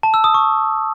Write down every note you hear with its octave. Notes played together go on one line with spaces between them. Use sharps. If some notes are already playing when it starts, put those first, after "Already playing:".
A5
E6
D#6
C#6